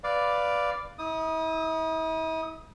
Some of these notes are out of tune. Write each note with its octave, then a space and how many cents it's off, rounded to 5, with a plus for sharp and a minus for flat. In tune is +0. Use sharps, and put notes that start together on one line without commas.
B4 +0 D5 +0 F5 +0
E4 -45 D#6 +0